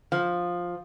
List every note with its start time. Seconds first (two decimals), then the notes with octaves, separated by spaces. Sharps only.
0.12 F3